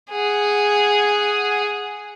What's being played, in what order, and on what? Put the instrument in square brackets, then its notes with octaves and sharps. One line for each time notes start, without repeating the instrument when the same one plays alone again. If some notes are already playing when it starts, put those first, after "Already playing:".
[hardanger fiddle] G#4 F#5